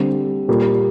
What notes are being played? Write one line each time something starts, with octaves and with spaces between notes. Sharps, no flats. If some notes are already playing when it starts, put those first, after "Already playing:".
Already playing: D3 G3 C4
A#2 G3 A#3